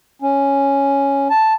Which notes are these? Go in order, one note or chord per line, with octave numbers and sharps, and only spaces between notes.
C#4
A5